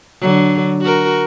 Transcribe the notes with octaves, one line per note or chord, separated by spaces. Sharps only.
D3 F#3
F#4 A#4